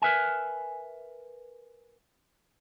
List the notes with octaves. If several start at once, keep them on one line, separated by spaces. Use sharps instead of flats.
A#4 B4 E5 G#5